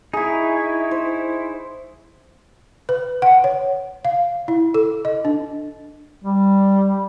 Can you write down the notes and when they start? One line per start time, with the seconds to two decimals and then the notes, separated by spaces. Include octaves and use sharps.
0.13 D#4 E4 G#4 C#6
0.91 C5
2.89 B4
3.22 F#5
3.44 C#5
4.05 F5
4.48 E4
4.74 A4
5.05 D#5
5.25 D4
6.24 G3